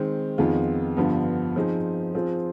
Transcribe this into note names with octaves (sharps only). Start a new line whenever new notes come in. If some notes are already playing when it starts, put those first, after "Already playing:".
Already playing: D#3 G#3 C4
F2 D#3 B3 F4 G#4
G2 D3 F3 B3
F3 C4 D#4 G#4
F3 C4 F4 G#4